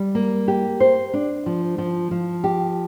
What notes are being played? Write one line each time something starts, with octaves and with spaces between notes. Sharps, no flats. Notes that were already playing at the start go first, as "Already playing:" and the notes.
Already playing: G3
A#3
G4
C5
D4
F3
F3
F3
G4